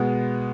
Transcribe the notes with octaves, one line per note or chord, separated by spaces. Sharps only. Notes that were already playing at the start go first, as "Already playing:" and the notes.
Already playing: B2 G#3 B3